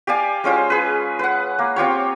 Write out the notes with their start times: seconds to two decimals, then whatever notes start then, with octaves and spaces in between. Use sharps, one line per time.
0.07 G4 D5 F5 G#5
0.44 G#3 C#4 F4 C5
0.70 G#4 B4
1.19 B4 F#5
1.59 A#3
1.76 C4 F4 G4 C#5